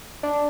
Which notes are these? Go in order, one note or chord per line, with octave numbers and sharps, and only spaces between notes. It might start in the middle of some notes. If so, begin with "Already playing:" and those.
D4